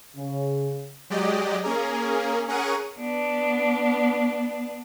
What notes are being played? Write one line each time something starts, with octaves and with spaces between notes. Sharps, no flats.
C#3
F#3 G#3 G4 D5 D#5
A#3 C#4 G#4 A#4
C#4 G#4 A#4 F#5 C#6 D#7
B3 D4